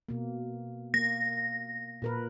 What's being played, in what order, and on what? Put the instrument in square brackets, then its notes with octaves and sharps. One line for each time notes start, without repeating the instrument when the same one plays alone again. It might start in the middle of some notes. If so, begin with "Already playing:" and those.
[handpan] B2 A#3
[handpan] A#3 [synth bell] A#6
[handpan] A#2 A#4 B4